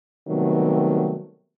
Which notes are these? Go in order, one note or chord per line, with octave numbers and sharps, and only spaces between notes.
C3 D#3 F#3 G3 A3 B3